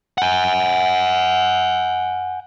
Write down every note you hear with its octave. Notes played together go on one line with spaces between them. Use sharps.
F#5 G#5